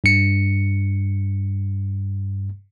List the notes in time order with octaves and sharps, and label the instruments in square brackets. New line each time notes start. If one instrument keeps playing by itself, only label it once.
[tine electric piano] G2 C#7